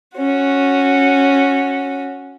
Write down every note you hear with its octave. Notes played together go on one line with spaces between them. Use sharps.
C#4 F#4